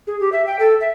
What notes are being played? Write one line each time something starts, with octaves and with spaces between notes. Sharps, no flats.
G#4
G4
E5
G5
A4
E5